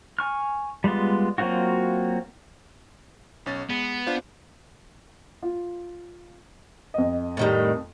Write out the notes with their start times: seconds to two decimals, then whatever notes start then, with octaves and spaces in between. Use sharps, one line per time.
0.19 G#5 C#6 F6
0.84 G3 G#3 B3 F4
1.38 F#3 A#3 C4 F4 F#4
3.46 B1 C#4 A6
3.70 G#3 B3
4.07 D4 F4 C5
5.42 F4
6.94 F2 D#5
7.37 A2 D#3 G3